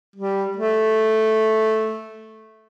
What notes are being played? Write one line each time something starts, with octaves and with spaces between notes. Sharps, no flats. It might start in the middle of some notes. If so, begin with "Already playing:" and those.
G3
A3